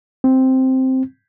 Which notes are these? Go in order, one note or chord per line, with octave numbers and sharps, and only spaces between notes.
C4